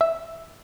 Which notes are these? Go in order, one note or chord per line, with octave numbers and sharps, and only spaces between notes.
E5